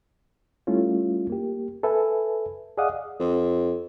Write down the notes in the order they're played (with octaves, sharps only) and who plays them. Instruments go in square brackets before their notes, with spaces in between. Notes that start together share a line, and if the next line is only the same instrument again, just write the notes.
[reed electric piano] G3 A3 C#4 E4 F4
A#3 G4
A4 B4 E5 G#5
G#4 D5 D#5 F5 F#5 D#6
[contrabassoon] F2